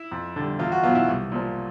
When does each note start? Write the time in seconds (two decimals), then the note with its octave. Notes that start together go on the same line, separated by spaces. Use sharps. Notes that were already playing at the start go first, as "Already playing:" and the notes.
Already playing: E4
0.12 F2
0.36 D3 G3
0.59 E2 F4
0.72 F#4
0.83 B2 F#3 B3 F4
0.95 E4
1.08 C2
1.32 A#2 F3